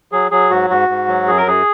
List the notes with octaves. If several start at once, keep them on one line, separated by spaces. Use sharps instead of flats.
F#3 G#4
F#3 G#4
G#2 F#4
G#2 F#4
G#2
F#3
F#2 G#4
A#4
F#2 G#4